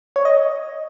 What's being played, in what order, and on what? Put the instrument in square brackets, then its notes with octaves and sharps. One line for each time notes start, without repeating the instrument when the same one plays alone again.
[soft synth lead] C#5
D#5